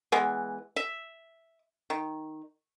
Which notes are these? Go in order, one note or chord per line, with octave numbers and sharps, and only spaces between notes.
E3 G#3 B3
E5
D#3